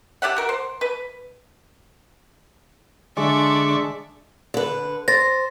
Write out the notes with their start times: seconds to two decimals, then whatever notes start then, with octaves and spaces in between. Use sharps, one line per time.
0.22 G4 D5 E5 F#5
0.36 F#4 A#4
0.49 C5
0.81 B4
3.17 D3 G#3 D4 D5 E5 C#6
4.54 D3 B4
5.08 C5 A6 A#6